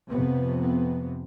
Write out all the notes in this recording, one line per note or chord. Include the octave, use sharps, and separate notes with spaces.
F2 C3 B3
B3